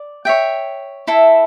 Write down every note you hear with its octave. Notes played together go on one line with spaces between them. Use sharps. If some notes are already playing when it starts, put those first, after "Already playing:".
Already playing: D5
C#5 E5 G5
E4 A4 E5